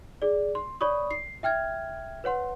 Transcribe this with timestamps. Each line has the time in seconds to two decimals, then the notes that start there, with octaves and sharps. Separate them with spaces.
0.22 G#4 D5
0.55 C6
0.81 C#5 D5 B5 C#6 D#6
1.11 C7
1.43 E5 G5 F6 G#6
2.24 B4 C#5 F#5 C6